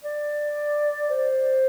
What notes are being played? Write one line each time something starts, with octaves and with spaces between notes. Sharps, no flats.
D5
C5